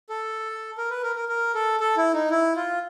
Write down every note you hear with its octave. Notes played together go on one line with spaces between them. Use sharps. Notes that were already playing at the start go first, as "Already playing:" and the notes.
A4
A#4
B4
A#4
A#4
A#4
A4
A4
E4
D#4
E4
F4